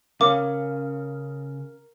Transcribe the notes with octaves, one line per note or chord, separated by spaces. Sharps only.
C#3 C#4 A#4 F5 D6